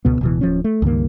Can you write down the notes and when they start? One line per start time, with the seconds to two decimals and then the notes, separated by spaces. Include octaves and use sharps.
0.05 C#2 B2 B3
0.21 D1 B2 E3
0.41 D1 F3 C#4
0.64 A3
0.82 C#2 G2 D#3 A#3